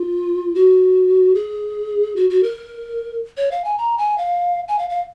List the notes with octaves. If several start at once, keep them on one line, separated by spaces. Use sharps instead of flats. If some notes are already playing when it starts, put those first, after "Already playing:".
Already playing: F4
F#4
G#4
F#4
F#4
A#4
C#5
F5
G#5
A#5
G#5
F5
G#5
F5
F5